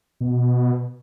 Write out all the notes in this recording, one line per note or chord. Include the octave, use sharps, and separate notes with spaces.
B2